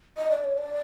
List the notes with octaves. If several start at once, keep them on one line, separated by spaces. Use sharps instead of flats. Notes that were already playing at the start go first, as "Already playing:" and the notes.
D#5
D5
C#5
D5